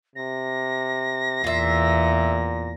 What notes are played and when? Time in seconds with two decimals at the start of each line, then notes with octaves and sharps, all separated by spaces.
0.16 C3 A#6
1.44 E2 A#2 F4 E5